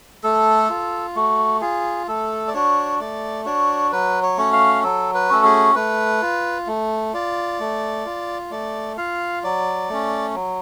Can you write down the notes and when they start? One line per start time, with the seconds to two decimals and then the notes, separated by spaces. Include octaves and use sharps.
0.24 A3 A4
0.70 F4
1.16 A3 F#4
1.61 F4 G#4
2.08 A3 A4
2.48 D5
2.54 D4 F#4 C#5
3.00 A3 D5
3.45 D4 F#4 C#5
3.92 F#3 B4
4.23 C#5
4.37 A3 C#4 F#4
4.53 F5
4.83 F#3 A4
5.14 B4
5.29 A3 C#4 F#4 A4
5.44 G#4
5.75 A3 B4
6.22 F4
6.67 A3
7.13 F4 D5
7.60 A3
8.06 F4
8.51 A3 D5
8.98 F4 F5
9.43 F#3 D5
9.89 A3 C#4
10.35 F#3